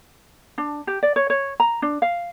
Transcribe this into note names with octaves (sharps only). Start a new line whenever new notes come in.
D4
G4
D5
C#5
C#5
A#5
D4
F5